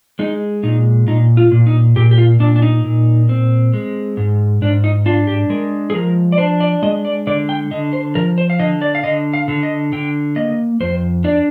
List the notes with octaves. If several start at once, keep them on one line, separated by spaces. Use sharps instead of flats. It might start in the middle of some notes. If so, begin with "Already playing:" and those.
G#3 D#4
A#2 D#4
A#2 D#4
F4
A#2
D#4
A#2 G4
G4
F4
A#2 D4
D4
D#4
A#2
C4
G#3
G#2
G#2 D4
D#4
D4 F4
G4
G#3 A#4
G#4
F3 A#4
D5
D4 C5
D5
G#3 D#5
D5
D3 D5
G5
D3 D#5
C5
F3 A#4
C5
F5
D3 D#5
D5
F5
D3 D#5
F5
D3
D#5
D3 G5
A#3 D#5
F2 C5
D4 D5